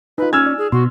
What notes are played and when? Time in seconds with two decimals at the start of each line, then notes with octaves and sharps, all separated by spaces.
0.18 D#4 F4 B4
0.33 C#4 G#5 E6 F6 G#6
0.46 D5
0.58 G#4
0.72 B2 F#4 C6